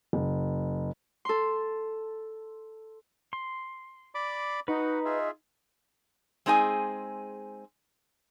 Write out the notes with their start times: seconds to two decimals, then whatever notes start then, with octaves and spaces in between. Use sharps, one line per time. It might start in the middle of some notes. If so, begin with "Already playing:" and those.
0.13 F#1
1.25 A4 C6
3.33 C6
4.15 D5 B5 D6
4.68 D#4 F#4 B4 F#5
5.05 F4 G#4 E5
6.46 G#3 C4 D#4 G#4 G#5